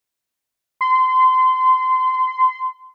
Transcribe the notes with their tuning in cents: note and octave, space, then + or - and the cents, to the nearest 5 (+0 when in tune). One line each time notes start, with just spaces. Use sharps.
C6 -25